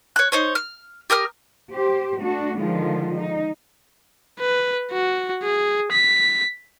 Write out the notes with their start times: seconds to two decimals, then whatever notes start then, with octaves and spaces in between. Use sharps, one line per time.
0.16 C#5 F#6
0.32 D#4 C5 C#5
0.55 F6
1.10 G4 A#4 D#6 F6
1.72 G4 C5
2.19 A3 D4 F#4
2.56 D3 D#3 F3 G#3 F4
3.19 D#4
4.40 B4
4.92 F#4
5.44 G#4
5.92 B6